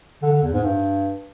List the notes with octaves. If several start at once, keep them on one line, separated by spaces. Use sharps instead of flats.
D3
D3
E2
G#2
G2